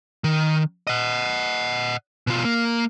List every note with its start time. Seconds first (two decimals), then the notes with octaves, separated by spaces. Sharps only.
0.24 D#3
0.87 D#5 F#5
2.27 B2 F4
2.45 A#3